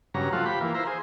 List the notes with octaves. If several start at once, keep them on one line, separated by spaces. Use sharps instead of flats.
G2 C#3 F#3 A#5
F3 A3 F4 F#4
F3 G4 B5
E3 A#3 F4
E4 F4 C5 A#5
G#4 C5